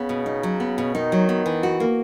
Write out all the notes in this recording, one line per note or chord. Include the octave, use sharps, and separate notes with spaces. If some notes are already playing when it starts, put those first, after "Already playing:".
Already playing: C#3 B3
B2
D#4
F#3
B3
B2
D#3 D#4
F#3
B3
E3
F#4
A#3